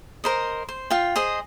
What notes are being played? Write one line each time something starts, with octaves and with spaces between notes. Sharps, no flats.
A#4 C5 D#5
C5
F4 G5
G#4 C5 D#5